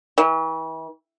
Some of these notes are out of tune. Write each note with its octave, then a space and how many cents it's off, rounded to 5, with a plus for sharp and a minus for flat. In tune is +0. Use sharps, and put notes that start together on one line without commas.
E3 -35